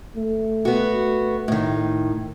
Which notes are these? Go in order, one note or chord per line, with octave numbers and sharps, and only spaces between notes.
A3
B3 F#4
A2 D#3